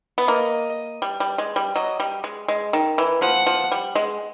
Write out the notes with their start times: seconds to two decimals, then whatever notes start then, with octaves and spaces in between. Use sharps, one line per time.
0.18 B3
0.28 A#3 D#5
1.02 G3
1.20 G3
1.38 G#3
1.56 G3
1.75 F#3 D#5
2.00 G3
2.24 G#3
2.48 G#3
2.73 D#3
2.98 E3
3.22 F3 F#5
3.46 F3
3.72 G3
3.95 G#3